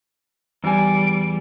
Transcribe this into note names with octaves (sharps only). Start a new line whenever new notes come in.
E2 G3 G#5